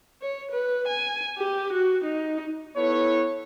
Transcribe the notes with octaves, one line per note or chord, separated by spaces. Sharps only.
C#5
B4
G#5
G4
F#4
D#4
B3 E4 A4 B4 C#5